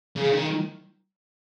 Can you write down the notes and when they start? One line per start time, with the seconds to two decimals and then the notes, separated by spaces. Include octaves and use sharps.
0.16 C#3
0.33 D#3